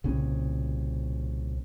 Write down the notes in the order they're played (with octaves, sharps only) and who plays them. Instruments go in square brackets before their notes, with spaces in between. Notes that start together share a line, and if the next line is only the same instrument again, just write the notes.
[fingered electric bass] C2 A#2 C#3